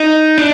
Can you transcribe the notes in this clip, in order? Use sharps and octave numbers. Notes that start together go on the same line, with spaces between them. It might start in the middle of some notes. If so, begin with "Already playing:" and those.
Already playing: D#4
D4